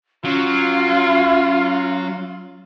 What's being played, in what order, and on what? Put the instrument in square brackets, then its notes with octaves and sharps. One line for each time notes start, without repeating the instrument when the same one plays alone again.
[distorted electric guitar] F#3 [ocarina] C#4 [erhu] F4